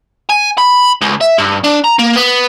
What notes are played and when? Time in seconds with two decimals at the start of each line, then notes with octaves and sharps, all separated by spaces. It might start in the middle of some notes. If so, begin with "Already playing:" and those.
0.29 G#5
0.58 B5
1.01 C#2
1.21 E5
1.38 G2
1.64 D4
1.84 A#5
1.99 A#3
2.16 B3